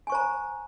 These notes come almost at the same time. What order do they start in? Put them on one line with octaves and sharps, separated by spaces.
G#5 C#6 C5 A#5